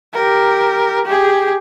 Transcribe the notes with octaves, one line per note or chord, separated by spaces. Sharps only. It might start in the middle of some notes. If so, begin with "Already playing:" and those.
G4 A#4
G4 G#4